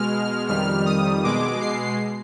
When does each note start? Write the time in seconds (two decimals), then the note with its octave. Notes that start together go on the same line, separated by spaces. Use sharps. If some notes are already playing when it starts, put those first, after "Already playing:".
Already playing: B2 G#3 F6
0.48 F2 D#3 G3 F6
0.86 D#6
1.24 B2 G#3 D6
1.61 C7